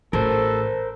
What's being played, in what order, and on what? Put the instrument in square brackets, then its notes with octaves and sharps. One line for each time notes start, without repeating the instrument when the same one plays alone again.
[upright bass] A1 [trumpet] A4 [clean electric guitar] A#4 C5